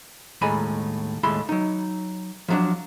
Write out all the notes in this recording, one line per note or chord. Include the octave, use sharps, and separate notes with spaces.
D#2 A2 G#3 G#5 A#5 B5
D#2 A2 G#3 E4 B5 C6
F#3 D#4
F3 F#3 D4